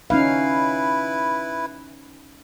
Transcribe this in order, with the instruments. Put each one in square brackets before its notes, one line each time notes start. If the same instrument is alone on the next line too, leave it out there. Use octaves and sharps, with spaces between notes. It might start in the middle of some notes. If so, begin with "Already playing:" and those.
[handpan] C#4 D#4 F5 [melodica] E4 B4